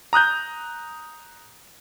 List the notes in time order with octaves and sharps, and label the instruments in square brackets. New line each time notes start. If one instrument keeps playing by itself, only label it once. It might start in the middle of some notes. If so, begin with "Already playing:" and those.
[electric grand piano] A#5 D#6 F#6 G6